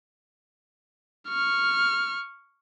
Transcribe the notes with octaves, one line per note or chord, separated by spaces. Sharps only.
C#6 F6